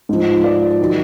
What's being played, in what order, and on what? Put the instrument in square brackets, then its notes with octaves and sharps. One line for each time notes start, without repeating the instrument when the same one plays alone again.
[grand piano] G#2 F3
D5
D#3 F#3